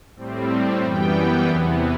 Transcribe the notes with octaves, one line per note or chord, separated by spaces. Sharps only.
A2 G3 C4
F#2 E3 G3 B3 G5
G5
E2 C3 E3 B3